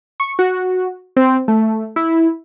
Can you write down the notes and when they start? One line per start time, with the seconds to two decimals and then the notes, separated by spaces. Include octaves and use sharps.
0.20 C#6
0.39 F#4
1.16 C4
1.48 A3
1.96 E4